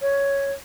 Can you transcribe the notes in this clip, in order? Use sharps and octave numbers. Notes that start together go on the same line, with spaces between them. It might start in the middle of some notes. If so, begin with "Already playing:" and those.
C#5